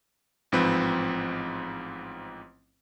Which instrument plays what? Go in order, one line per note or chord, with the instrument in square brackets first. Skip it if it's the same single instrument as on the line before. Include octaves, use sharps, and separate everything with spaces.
[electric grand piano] A1 G#2 F3 C4 B4